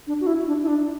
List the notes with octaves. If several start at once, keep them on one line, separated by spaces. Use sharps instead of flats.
D4
F#4
E4
D4
E4
D4